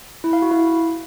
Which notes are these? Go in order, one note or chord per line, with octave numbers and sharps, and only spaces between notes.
E4
F5
F#4
E4